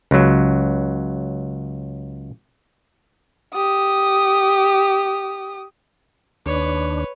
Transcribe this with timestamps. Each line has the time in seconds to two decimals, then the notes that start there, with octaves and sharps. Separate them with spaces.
0.11 C#2 F#3
3.54 G4 D#6
6.46 D#2 D4 B4 C#5